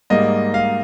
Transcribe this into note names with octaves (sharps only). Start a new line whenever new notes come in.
G#2 G3 A#3 D#5
F5